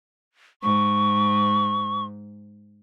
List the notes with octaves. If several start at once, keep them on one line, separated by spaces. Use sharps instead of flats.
G#2 C#6